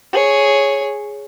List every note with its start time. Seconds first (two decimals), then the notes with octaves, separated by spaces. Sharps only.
0.13 G#4 C#5